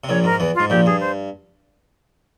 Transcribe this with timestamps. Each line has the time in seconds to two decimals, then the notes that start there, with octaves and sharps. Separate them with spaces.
0.04 C3
0.09 A#1 A#2 C#5
0.24 G#2 A#4
0.40 E2 E3
0.55 G#2 F4
0.70 A#1 A#2 G4
0.86 G2 G#4
1.00 C5